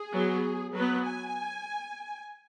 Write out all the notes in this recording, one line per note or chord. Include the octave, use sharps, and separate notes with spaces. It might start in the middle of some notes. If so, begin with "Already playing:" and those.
Already playing: G#4
F#3 B3
F#3 B3 B4
G#5